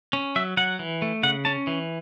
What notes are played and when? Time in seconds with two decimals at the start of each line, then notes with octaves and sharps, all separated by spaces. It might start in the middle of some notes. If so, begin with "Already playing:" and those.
0.13 C#4
0.36 F#3 E5
0.57 F#3 F#5
0.79 E3
1.02 A3
1.23 C#3 F#5
1.45 C#4 A5
1.67 E3